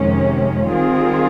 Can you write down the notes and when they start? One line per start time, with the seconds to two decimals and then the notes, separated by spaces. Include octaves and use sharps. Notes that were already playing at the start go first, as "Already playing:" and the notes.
Already playing: F2 C3 D#3 G#3 C#4
0.68 D#3 G3 C4 F4 G#4